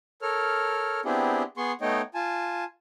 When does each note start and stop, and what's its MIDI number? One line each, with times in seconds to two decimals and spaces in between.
0.22 1.00 69
0.22 1.00 70
0.22 1.00 73
0.22 1.00 89
1.05 1.43 59
1.05 1.43 60
1.05 1.43 62
1.05 1.43 64
1.05 1.43 67
1.05 1.43 68
1.57 1.72 59
1.57 1.72 68
1.57 1.72 84
1.57 1.72 85
1.81 2.01 57
1.81 2.01 59
1.81 2.01 63
1.81 2.01 73
1.81 2.01 75
1.81 2.01 79
2.14 2.64 65
2.14 2.64 80
2.14 2.64 81